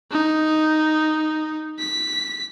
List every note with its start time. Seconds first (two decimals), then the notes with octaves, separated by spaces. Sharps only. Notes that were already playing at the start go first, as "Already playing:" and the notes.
0.11 D#4
1.79 B6